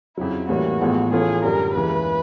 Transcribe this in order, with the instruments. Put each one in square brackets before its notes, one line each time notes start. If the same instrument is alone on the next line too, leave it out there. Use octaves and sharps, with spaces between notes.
[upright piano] F2 C#3 F#3 [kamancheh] E4
[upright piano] A2 E3 G3 A#3 C#4 [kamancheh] F#4
[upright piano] A1 A2 F3 G#3 B3
[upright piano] A2 E3 A3 C#4 F4 [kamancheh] G#4
[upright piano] F#2 D3 G3 [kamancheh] A#4
[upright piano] D#2 C#3 E3 G#3 [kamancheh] B4